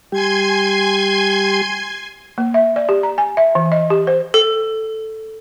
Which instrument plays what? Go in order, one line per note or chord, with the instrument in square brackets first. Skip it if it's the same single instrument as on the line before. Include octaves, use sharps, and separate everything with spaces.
[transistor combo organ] G3 G4 [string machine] G#5 C6 G#6
[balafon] A#3
E5
D5
G4
A#5
G#5
E5
E3
D#5
G4
C5
[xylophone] A4